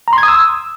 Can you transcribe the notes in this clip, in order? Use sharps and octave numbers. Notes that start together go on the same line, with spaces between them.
A#5
C6
G#6
D#6
E6